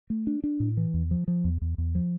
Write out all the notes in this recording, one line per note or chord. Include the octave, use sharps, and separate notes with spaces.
A3
D4
D4
A2
E3
E2
F3
F3
E2
E2
E2
F3